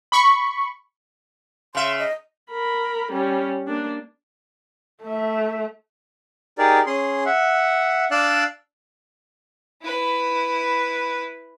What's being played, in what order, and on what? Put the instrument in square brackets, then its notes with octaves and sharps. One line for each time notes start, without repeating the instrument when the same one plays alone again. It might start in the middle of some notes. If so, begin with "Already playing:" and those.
[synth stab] B5 C#6
[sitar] C#3 E5 [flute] C6
[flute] D#5
[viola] A#4 B5
G3 C#4
A#3 D4
[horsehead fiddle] A3 E5
[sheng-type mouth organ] D#4 G4 G#4 A#4 D5
C#4 G#4 C6
E5 F#5
D4 D5 F5 E6 F#6
[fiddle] E4 B4